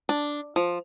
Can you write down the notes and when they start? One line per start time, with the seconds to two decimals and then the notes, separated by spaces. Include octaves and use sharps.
0.09 D4
0.56 F3